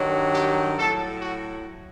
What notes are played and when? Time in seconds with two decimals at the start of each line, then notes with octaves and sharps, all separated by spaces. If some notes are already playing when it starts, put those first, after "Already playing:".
Already playing: G2 D#3 F#3
0.34 G4
0.77 A2 F#3 A4
1.21 F#4